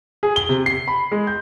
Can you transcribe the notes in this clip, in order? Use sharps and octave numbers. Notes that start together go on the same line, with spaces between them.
G#4
G7
C3
C7
B5
G#3
G6